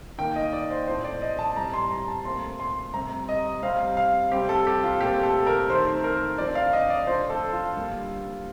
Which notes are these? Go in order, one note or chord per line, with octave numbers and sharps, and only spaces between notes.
D#3 A#3 G5
D#5
D5
C5
A2 F3 A3 C4 C5
D5
D#5
A5
A2 G3 C4 A#5
C6
A#5
A5
A#2 A3 C4 C6
C6
C3 G3 C4 A#5
D#5
C3 G3 C4 F5
F5
C3 G3 C4 G4
A4
G4
F4
A#2 A3 C4 G4
A4
A#4
D#3 A3 C4 C5
A#4
D3 F3 C4 D5
F5
D#5
D5
D3 F3 A3 C4 C5
A4
F4
D3 G3 A#3